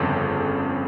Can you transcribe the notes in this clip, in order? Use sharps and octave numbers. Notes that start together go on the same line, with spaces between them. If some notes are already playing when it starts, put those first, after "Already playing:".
Already playing: G1 F2 C#3 A4